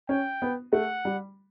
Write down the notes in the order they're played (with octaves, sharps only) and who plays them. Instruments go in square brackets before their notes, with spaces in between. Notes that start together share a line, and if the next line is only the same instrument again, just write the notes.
[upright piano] C#4 [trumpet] G5
[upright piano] B3
[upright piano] A3 [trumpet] F#5
[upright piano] G3